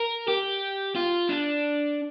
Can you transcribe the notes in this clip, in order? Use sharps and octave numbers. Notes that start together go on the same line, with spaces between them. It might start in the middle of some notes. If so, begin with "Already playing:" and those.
Already playing: A#4
G4
F4
D4